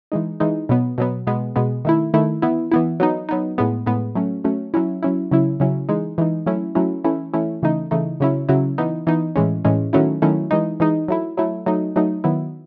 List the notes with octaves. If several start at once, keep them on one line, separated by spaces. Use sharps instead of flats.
E3 G#3 D#4
E3 G#3 D#4
B2 F#3 B3
B2 F#3 B3
B2 G#3 B3
B2 G#3 B3
D#3 A3 E4
D#3 A3 E4
E3 B3 E4
E3 B3 E4
F#3 B3 D#4
F#3 B3 D#4
A2 G#3 B3
A2 G#3 B3
F#3 A3 C#4
F#3 A3 C#4
F#3 C#4 E4
F#3 C#4 E4
C#3 F#3 C#4 E4
C#3 F#3 C#4 E4
E3 G#3 D#4
E3 G#3 D#4
F#3 A3 C#4 E4
F#3 A3 C#4 E4
E3 A3 C#4 E4
E3 A3 C#4 E4
C#3 E3 A3 D#4
C#3 E3 A3 D#4
C#3 F#3 C#4 E4
C#3 F#3 C#4 E4
E3 B3 D#4
E3 B3 D#4
A2 E3 G#3 C#4
A2 E3 G#3 C#4
D#3 F#3 A3 C#4 E4
D#3 F#3 A3 C#4 E4
E3 G#3 D#4
E3 G#3 D#4
F#3 A3 E4
F#3 A3 E4
F#3 A3 D#4
F#3 A3 D#4
D#3 F#3 B3 E4